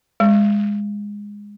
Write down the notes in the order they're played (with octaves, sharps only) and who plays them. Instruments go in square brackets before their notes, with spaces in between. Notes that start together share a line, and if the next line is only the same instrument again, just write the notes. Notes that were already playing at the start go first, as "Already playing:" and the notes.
[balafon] G#3